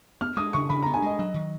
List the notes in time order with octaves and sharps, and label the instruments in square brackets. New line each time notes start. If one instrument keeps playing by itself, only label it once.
[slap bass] B3 [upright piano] F6
[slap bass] G#3 [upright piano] D#6
[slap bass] C#3 [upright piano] C#6
[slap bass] C#3 [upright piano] B5
[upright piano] A#5
[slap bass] B3
[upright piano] G#5
[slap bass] G#3 [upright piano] D#5
[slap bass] F#3
D#3